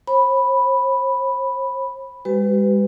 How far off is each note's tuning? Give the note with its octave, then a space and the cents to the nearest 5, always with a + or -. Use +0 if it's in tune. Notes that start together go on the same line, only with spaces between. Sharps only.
C5 +40 B5 +0
G#3 -40 G4 -40 B4 +20